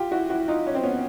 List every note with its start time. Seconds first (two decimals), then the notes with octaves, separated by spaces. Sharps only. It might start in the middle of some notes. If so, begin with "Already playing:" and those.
Already playing: F4 G4
0.11 E4 F#4
0.30 E4 F#4
0.48 D#4 F4
0.67 C#4
0.75 C4
0.83 B3 C#4